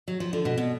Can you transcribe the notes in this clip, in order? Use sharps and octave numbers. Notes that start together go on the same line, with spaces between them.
F#3
F3
D3
B2
B2